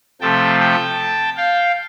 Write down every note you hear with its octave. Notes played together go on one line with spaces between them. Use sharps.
C3 F3 A3 G5 A5
G5 A5
F5 G5